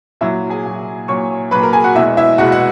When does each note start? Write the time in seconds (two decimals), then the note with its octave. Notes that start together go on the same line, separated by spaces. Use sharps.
0.21 A#2 F#3 E4 E5
0.50 G#4 G#5
0.65 A#2 F#3
1.08 A#2 F#3 C#5 C#6
1.51 F#3 B4 B5
1.55 A#2
1.63 A#4 A#5
1.73 G#4 G#5
1.84 F#4 F#5
1.95 E2 B2 G#3 E4 E5
2.17 E4 E5
2.38 E2 B2 G#3 F#4 F#5
2.52 F#5